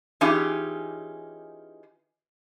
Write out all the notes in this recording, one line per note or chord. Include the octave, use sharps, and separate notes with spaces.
E3 C#4 D#4 F4 G4 G#4